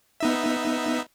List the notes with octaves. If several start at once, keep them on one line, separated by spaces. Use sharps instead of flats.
B3 D#4 E5